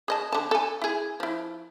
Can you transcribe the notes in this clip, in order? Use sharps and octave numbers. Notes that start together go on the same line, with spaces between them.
G#4 D#5 A5
D3 A5
A4 G#5
E4 G#4
F3 E4